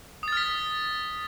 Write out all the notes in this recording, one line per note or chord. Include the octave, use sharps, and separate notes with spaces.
D#6 F6 A6 B6